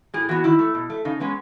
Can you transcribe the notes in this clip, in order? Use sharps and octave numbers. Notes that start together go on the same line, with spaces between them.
A2 G#4
E3 B3 F#4
D#3 E4
A3
B2
A3
C#3 D#4
G#3 B3 C#4